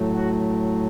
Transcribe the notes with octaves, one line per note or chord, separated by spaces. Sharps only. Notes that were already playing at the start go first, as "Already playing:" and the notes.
Already playing: A2 F#3 A3
F#4